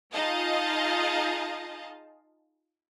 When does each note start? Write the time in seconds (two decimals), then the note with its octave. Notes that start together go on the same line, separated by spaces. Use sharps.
0.13 D#4 F4 G#4 D#5 F5 A5